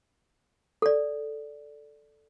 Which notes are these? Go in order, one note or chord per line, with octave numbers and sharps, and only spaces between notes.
A4 D5